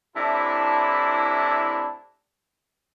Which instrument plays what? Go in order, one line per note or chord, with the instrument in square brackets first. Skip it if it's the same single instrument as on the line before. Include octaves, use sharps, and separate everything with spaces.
[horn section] A2 C3 D4 E4